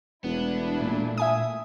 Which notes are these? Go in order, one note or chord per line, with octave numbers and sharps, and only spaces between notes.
E1 A3 B3 D4 E4
A#2
E5 G#5 D#6